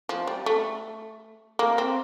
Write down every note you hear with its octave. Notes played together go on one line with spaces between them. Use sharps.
F3
G3
A3
A#3
C4